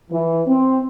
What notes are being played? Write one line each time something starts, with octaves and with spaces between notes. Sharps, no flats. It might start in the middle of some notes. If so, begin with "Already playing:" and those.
E3
C4